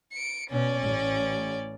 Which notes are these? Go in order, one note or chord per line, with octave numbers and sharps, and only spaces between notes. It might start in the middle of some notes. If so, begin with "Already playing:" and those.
C#7 D7
B2 C#4 D5
A1